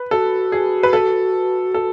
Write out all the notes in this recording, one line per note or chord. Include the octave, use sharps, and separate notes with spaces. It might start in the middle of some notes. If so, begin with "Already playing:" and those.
Already playing: B4
F#4 A4
G#4
B4
A4
A4